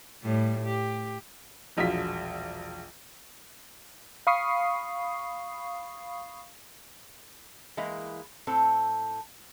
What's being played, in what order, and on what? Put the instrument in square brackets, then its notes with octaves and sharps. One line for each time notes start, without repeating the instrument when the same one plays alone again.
[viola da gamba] A2 G3
G4
[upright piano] E1 A#1 F#3 F4 B6
[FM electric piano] F5 B5 C#6 D#6 C7
[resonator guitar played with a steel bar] E3 G#3 A#3 E4
A2 C4 A4